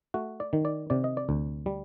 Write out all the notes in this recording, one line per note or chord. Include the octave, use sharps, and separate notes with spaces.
A3 F#4
D5
D#3
D5
C3 D5
D#5
D5
D2
G3